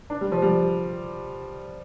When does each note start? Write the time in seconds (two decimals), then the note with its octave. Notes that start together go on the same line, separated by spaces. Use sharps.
0.10 D4
0.21 G3
0.32 F3
0.42 G3